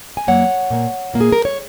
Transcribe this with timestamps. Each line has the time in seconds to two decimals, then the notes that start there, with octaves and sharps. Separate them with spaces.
0.17 G#5
0.27 F#2 F#3 A#3 C#5 F#5
0.70 A#2 A#3
1.14 A#2 A#3
1.21 G#4
1.32 A#4
1.45 C#5